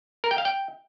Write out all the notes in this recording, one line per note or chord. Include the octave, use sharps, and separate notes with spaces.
A#4
G5
F5
G5